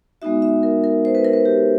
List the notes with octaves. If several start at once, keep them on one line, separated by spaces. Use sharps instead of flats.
G#3 B3 D#4 F#4 E5
E5
A#4
A#4
C5
B4
A#4
B4
G4